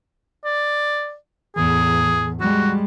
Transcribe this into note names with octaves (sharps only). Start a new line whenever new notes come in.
D5
E2 A2 G#4
G3 G#3 F#4